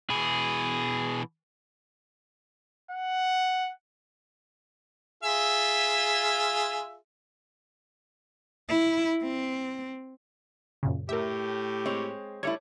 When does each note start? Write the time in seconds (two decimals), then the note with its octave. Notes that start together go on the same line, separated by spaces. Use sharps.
0.10 B2 E3 G#4
2.91 F#5
5.23 F4 G#4 E5
8.69 E4
9.23 C4
10.83 F#2 A#2 C#3
11.09 A2 G4 A#4 E5
11.85 G#3 C4 C#5
12.43 G3 A3 E4 C#5